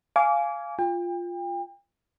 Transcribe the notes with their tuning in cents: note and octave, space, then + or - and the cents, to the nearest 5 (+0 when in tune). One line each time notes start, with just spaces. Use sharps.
F5 -10 G#5 +10 D6 -30
F4 +0 G5 +35